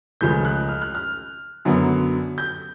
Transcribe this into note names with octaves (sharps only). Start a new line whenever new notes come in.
C#2 C#3 F3 A3 G6
F#6
F6
F#6
F6
F#2 D3 F#3 B3
G6